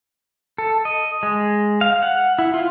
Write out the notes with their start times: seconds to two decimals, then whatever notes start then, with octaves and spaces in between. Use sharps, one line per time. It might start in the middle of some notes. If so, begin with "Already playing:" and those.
0.58 A4
0.85 D#5
1.23 G#3
1.81 F5
2.02 F#5
2.39 E4
2.54 F4